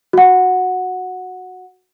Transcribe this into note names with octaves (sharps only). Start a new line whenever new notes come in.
F#4 F#5